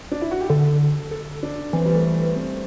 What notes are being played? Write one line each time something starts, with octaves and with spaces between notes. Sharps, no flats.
D4
E4
F#4
G4
D3 A4
A4
D4
E3 C4
G3
A3
C4